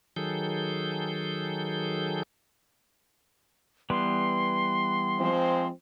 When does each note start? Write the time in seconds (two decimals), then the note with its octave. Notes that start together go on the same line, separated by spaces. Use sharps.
0.16 D#3 F#3 G#4 A4 G6
3.90 E3 G3 B3 C6
5.18 F3 G#3 C4